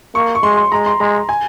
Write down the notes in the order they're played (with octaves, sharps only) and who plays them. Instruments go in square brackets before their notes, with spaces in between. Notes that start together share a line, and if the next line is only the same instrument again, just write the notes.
[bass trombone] A#3 [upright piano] C#6
[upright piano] C#6
[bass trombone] G#3 [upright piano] C6
[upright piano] C6
[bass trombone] G#3 [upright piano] A#5
[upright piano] C6
[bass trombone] G#3 [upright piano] A#5
[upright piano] G#5